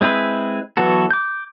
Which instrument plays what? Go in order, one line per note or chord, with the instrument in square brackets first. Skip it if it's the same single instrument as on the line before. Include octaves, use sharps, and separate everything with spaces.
[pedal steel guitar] G#3 C4 E4 G#4 B4
E3 F#3 B3 F#4 A4
D6 G6